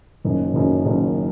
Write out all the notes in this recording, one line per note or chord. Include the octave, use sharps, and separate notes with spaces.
F#1 F#2 D#3
F#1 F#2 D#3
F#1 F#2 D#3